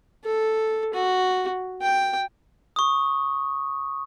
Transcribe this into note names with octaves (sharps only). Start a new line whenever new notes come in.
A4
F#4
G5
C#6 D#6